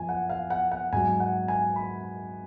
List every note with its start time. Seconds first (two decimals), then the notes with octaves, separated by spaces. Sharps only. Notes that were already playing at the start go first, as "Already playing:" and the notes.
Already playing: F#2 F3 G#5
0.09 F#5
0.29 F5
0.50 F#5
0.72 F#5
0.92 G#2 F#3 G#5
1.20 F#5
1.48 G#5
1.76 B5